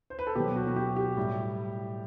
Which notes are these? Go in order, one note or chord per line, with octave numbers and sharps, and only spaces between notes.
C5
B4
A4
B2 F#3 G4
F#4
F#4
G4
G4
A2 G3